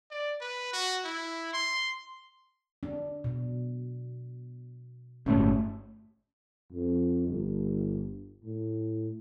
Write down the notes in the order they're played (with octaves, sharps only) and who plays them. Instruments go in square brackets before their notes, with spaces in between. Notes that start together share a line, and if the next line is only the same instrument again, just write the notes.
[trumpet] D5
B4
F#4
E4
C6
[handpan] D4
B2
[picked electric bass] G1 A2 A3 [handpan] C#4
[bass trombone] F2
G1
A2